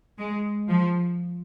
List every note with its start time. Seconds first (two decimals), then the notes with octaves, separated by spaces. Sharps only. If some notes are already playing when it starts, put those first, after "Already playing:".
0.18 G#3
0.69 F3